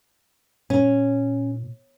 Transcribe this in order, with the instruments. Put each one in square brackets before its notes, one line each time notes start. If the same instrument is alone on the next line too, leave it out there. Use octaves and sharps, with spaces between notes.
[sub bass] A#2 [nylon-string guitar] C#4